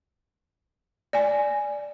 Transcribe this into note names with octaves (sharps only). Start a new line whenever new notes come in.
D5 G#5